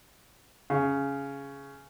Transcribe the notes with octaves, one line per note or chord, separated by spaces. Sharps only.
C#3